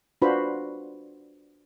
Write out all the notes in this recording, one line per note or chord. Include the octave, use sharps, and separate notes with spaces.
D4 F4 F#4 B4 C5 B5